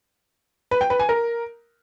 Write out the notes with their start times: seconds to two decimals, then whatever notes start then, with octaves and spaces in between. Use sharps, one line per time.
0.71 B4
0.81 G5
0.90 B4
1.00 G#5
1.09 A#4